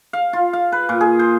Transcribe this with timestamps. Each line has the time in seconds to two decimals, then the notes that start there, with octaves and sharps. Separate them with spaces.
0.13 F5
0.33 F4
0.53 F5
0.72 B4
0.89 A#2
1.01 G#4
1.19 C5